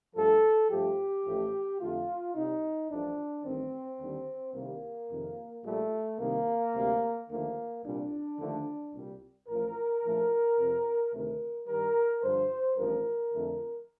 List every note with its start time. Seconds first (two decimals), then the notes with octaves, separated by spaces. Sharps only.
0.15 G2 F3 A3 A4
0.70 G2 F3 A3 G4
1.25 A1 A2 F3 A3
1.80 F2 D3 A3 F4
2.34 C2 C3 G3 D#4
2.89 A1 G2 F3 A3 D4
3.44 A1 G2 D#3 C4
3.99 D#2 D3 G3
4.54 C2 C3 D#3 G3 A#3
5.10 F2 C3 D#3
5.64 A#1 A#2 G3 A3
6.18 C2 C3 D#3 A#3
6.74 D2 C3 G3
7.29 D#2 D3 F3 A3 A#3
7.84 C2 A#2 G3 D4
8.38 D#2 D3 F3 A3
8.93 C2 A#2 G3
9.48 A1 A2 F3 A#4
10.03 A#1 A2 F3 A3
10.58 F2 C3 F3
11.12 D2 C3 D#3 A3 A#4
11.68 G2 D#3 G3 A#4
12.22 G2 D3 F3 C5
12.77 A1 G2 F3 A#4
13.33 F2 D3 A3